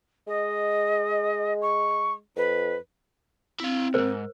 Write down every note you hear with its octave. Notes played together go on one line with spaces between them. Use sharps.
G#3 D#5
C#6
F2 B4
C4 E4 F5
C2 G#2 A#4 C5